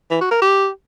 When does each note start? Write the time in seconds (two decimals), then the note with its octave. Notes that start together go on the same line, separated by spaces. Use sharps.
0.11 E3
0.21 F#4
0.31 A#4
0.41 G4